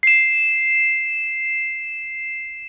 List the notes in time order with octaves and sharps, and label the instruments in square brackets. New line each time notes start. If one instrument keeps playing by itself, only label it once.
[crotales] C7 E7